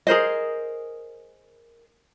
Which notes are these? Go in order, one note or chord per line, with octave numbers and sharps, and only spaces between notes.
G#4 A#4 C5 D#5